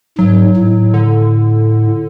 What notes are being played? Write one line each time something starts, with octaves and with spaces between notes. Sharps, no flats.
G#2 F#3
A2
D3